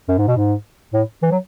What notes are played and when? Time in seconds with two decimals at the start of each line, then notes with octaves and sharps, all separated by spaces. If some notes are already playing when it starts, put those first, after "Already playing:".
0.08 F#2
0.18 G#2
0.27 B2
0.36 G#2
0.93 A2
1.22 E3
1.32 F#3